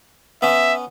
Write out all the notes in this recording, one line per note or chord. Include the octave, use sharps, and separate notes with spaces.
B3 C#4 E5